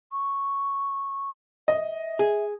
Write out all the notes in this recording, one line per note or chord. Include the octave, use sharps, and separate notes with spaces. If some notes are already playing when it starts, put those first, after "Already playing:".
C#6
D#5 E5
G#4